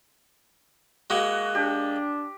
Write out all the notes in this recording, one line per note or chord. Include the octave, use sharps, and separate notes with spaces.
G#3 A#3 F#4
D4 G4